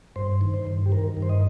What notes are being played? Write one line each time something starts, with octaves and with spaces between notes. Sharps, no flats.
G2 C5
D#3
C5
G2
G4
D#3 A#4
G2
C5
D#5